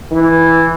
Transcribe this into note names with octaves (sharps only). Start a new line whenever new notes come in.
E3